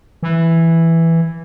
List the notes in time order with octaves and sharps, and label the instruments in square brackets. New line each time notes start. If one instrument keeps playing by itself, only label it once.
[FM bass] E3